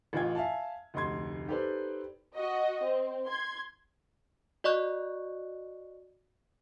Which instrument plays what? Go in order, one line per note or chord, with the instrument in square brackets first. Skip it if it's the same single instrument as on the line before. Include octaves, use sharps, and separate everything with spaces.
[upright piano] A1 E3 F4 D#5 G5 G#6
E5 F5 G#5 A5
F1 D2 D#5 C6 G#6
D#4 G4 A4 B4 C5 D5
[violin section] F#4 D#5
C4
C6 G#6
[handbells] F#4 D5 D#5 C#6 F#6